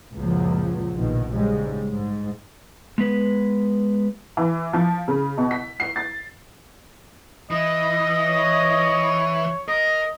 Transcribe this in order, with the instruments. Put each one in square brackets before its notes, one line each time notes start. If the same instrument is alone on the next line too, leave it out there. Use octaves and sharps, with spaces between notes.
[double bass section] C#2 F#2 A#2 F3 F#3
A#1 B2 D#3
G#2 C#3 G3 G#3
G#2
[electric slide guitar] G#3 B3 B4
[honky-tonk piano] E3
F3
C#3
B2
B6
C7
A6
[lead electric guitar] E3 [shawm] D#5
[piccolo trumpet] C#5
[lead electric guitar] A#4 [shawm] D#5